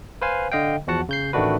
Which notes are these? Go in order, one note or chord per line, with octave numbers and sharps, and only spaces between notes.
B4 C5 F5 G#5
D3 D#5 F5 G5
E2 F3 F#4 F#5 A5
C#3 G6 C7
A1 D#3 A3 D4 F#4 B4